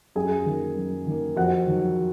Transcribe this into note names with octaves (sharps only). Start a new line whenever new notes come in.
F#2 G#4
D#3 A#3
F#2
D#3 A#3
F2 F#4 F#5
D#3 F#3